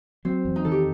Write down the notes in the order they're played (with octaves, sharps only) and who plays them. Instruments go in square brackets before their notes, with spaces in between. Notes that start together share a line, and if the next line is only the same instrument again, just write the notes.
[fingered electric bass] F#3 [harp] C4
[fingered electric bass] E2
[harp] D#4
[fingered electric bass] D#3 [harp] A4
[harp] G4